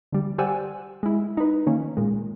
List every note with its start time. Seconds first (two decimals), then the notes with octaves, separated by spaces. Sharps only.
0.12 D3 G3
0.38 G4 C5 D5 F#5 G#5 E6
1.03 G#3 E4
1.37 D#4 B4
1.66 D#3 A#3 C#4
1.97 A#2 G#3